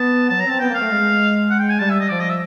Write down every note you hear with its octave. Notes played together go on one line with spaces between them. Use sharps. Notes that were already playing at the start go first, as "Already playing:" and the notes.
Already playing: B3 A5
F#3 A5
A#5
C4
A5
B3 G5
A#3 F5
A3
G#3
F#5
G5
G#5
G3 A5
E5
D#5
F3 D5
D#5
E5